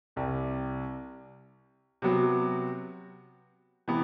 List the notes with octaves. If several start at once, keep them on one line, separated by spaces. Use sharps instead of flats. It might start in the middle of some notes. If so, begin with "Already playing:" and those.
C2 C3 G3
C3 F#3 B3 F#4
C3 E3 B3